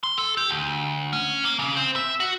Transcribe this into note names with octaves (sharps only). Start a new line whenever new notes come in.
C6
A4
G4
D2
C#4
A#3
C#3
C4
E5
F#4